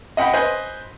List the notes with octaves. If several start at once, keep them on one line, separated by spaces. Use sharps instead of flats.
D#5 F#5 G5 B5
B4 C5 D#5 G#5